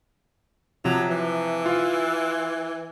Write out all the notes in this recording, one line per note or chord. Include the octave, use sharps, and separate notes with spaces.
C3 F3 F#3
E3
F4 F5